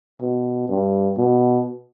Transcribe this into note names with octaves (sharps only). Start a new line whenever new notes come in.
B2
G2
B2